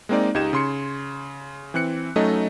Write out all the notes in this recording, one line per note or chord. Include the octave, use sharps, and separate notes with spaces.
G#3 A#3 C4 D#4 D5
C#2 D#4 G4 D#5 G#6 E7
C#3 C6 C#7
E3 C4 F#6 C#7
F#3 A3 C#4 D#4 A4 D#5